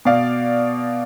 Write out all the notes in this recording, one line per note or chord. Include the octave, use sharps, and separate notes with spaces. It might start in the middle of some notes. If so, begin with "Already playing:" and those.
B2 D5 F5